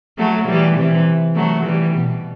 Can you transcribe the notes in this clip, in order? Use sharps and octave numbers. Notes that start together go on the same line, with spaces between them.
F#3 A3
E3 G3
C3 E3
F#3 A3
E3 G3
B2